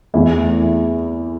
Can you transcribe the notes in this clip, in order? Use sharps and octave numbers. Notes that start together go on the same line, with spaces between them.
E2 E3 A3 E4